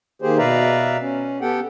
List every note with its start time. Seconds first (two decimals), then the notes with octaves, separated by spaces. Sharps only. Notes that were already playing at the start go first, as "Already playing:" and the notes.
0.22 D#3 A#3 G4 G#4 C5
0.38 B2 B4 D5 E5 F5 A#5
1.01 C#4
1.41 B3 G4 A4 F#5 G5